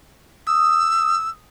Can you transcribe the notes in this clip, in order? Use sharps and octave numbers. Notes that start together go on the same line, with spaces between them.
D#6 E6